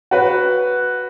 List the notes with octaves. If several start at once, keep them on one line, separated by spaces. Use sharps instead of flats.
F#4 B4